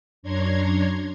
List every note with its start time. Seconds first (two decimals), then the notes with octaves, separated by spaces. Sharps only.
0.23 F#2 D4 C#5 A#5 C6 G#6